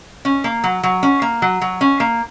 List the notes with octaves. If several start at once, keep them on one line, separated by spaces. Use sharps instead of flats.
C#4
A#3
F#3
F#3
C#4
A#3
F#3
F#3
C#4
A#3